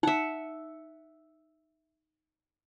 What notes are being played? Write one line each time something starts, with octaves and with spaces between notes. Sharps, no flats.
D#4 E5 F#5